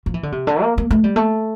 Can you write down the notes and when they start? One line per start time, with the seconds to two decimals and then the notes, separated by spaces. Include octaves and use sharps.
0.06 F3
0.14 E3
0.23 D3
0.32 C3
0.47 D3
0.62 A#3
0.78 A#3
0.91 A3
1.04 G3
1.16 A3